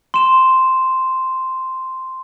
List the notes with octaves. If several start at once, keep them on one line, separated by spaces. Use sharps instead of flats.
C6 E7